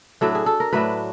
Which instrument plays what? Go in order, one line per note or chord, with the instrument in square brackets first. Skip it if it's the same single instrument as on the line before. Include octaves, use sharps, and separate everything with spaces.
[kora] A2 F#3 A3 D4 A4
G#4
A4
A#4
A2 F#3 A3 D4 B4